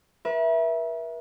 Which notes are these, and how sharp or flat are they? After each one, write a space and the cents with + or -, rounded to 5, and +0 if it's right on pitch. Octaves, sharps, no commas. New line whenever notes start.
B4 -45 E5 +0